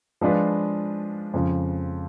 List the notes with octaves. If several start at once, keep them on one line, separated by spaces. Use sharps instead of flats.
F3 G#3 D4 F4 B4
F2 C#3 F3